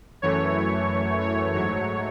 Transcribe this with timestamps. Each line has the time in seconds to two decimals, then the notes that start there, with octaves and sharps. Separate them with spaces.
0.22 F#2 E3 A3 C#5
1.21 C#5
1.54 G#2 F#3 A3 C#5